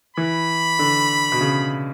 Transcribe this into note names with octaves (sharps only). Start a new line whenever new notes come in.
E3 B5
D3
B2
C#3